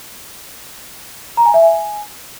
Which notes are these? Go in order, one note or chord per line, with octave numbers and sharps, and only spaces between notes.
A#5
G#5
E5
G#5